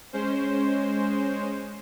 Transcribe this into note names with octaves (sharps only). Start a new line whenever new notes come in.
G#3 C#4 C5